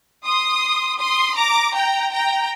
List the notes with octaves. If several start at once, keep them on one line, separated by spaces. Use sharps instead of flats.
C6 D#6
C6 D#6
A#5 D6
G5 A#5
G5 A#5